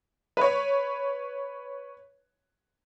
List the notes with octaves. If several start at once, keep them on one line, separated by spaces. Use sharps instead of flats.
B4 C#5